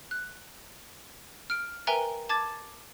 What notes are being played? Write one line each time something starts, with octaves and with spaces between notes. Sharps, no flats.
F#6
F6 D7
A#4 B4 E5 G5 G#5 A#5
A5 D6 G#6 A6